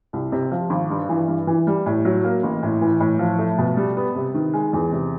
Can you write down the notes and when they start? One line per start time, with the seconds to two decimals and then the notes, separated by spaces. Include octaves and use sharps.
0.13 C2
0.32 C3
0.52 F3
0.70 G#1
0.90 G2
1.09 E3
1.28 G2
1.47 E3
1.67 G3
1.86 A2
2.05 F#3
2.24 A#3
2.43 A1
2.63 A2
2.81 E3
3.00 A2
3.19 F3
3.38 A3
3.58 B2
3.77 G3
3.97 B3
4.15 C3
4.34 D#3
4.53 G#3
4.73 E2
4.92 C3